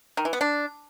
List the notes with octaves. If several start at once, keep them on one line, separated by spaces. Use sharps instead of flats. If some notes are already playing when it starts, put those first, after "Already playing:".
D#3
E3
B3
D4